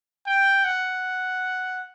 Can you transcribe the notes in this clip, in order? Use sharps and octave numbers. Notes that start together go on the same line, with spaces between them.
G5
F#5